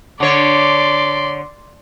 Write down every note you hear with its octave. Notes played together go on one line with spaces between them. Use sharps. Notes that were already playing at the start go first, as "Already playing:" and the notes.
D3 C#5 D5 C6